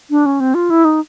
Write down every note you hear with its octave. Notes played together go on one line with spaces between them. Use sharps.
D4
C#4
C4
F4
E4
D#4